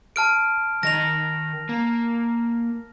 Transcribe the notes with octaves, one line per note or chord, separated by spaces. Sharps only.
A5 F6 D7
D#3 D#5 A#6 F7
A#3